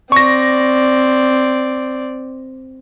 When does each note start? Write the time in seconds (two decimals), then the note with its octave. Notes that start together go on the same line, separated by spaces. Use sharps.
0.12 C4 D5 C#6 A#6